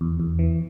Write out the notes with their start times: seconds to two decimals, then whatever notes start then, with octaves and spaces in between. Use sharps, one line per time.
0.01 E2
0.20 E2
0.39 E3